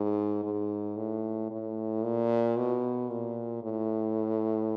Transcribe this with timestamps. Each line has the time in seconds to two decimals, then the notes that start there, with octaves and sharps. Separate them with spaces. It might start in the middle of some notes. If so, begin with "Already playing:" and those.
Already playing: G#2
0.44 G#2
0.97 A2
1.50 A2
2.04 A#2
2.57 B2
3.10 A#2
3.63 A2